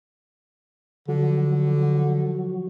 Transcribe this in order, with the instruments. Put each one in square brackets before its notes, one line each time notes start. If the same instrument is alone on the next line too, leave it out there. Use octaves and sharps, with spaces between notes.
[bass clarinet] D3 [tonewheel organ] F3 F#3 F#4